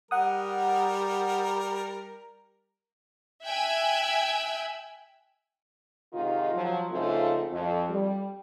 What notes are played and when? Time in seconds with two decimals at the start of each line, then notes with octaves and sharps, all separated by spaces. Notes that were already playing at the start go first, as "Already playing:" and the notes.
0.11 G3 A#4 F#5 D#6
3.45 E5 G5 G#5 E6 F#6 G#6
6.13 G#2 C3 D#3 F4
6.54 F3 F#3
6.90 G#2 C#3 F3 A3 C4 F4
7.52 F2
7.89 G3